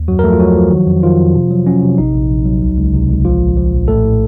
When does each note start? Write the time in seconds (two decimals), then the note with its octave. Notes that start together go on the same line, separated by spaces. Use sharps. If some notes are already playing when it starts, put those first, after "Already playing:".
Already playing: D#2
0.08 F#2 F#3 F#4
0.19 A#4
0.23 F3 A3 A4
0.32 F4
0.39 F3 F#3 F#4
0.56 F3
0.71 D#3
0.87 F2
1.03 D#3 F3 F4
1.20 F2
1.35 C3
1.51 F#3
1.67 F#3 C#4
1.83 C3
1.98 A#1 D#4
2.14 A#1
2.30 A#1
2.45 F#3
2.62 C#2
2.78 C#2
2.94 C3
3.10 C#2
3.25 A#1 F3 F4
3.41 A#1
3.57 F3
3.73 A#1
3.88 A2 A3 A4
4.04 A2